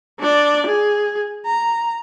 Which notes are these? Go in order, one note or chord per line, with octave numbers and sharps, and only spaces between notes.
D4 D5
G#4
A#5